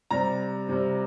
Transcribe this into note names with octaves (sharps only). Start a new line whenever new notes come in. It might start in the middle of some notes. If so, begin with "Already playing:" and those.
C3 G3 A#5
C3 G3